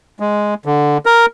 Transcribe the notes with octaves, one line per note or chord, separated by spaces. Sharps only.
G#3
D3
A#4